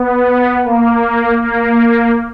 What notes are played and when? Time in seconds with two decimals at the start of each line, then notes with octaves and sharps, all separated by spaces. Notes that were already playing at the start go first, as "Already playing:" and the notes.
Already playing: B3
0.65 A#3
1.42 A#3